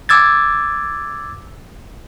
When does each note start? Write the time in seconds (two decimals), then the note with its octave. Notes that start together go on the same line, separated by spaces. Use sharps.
0.09 D6 E6 G#6 A6